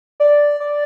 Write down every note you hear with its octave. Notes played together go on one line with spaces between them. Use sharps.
D5
D5